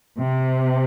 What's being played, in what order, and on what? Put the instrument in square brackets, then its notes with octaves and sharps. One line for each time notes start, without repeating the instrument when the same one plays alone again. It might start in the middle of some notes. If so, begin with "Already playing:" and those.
[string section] C3